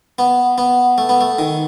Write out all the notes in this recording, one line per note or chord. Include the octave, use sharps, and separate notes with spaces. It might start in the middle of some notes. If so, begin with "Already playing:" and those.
B3
B3
A3
B3
A3
D#3